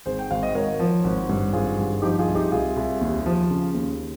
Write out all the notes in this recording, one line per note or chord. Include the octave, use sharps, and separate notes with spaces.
G#1 G#4 C5
G5
G#1 F5
D#5
G#1 A#4 C#5
F3
G#1
G2
G#1 F4 G#4
G2
F3 D#4 G4
F4 G#4
C2
D#4 G4
C2 F4 G#4
C2
D#2
F3
C#3
D#2